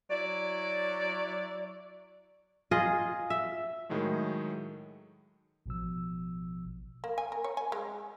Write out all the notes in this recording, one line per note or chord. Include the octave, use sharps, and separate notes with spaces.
F#3 E4 D5
F4 G#4 D#5
E5
A2 D#3 F#3 G#3 A3
A1 B2 F3 E6
A#3
G#5
A#4
C#5
G#5
G#3